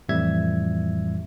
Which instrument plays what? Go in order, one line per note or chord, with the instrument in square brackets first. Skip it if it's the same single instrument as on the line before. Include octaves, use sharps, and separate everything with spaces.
[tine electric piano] F2 A2 E3 G3 E5 G#6